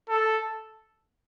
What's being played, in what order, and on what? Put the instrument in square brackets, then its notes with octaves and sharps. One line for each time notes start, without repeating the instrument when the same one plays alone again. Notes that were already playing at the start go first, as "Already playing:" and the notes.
[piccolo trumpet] A4